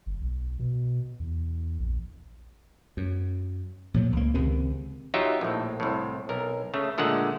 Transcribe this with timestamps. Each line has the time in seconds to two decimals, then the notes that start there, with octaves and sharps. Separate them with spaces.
0.06 G1
0.21 B1
0.59 B2
1.19 E2
1.79 A#1
2.97 F#2
3.94 A#2 F3 F#3
4.12 C#2 A#3
4.34 C#2 C3 D#3 C4
5.14 F#3 D#4 F4 G4 E5
5.41 A#1 A2
5.80 C2 A2
6.29 B1 A#4
6.74 C#3 A3
6.98 A#2 D3 G#3 A3 F#5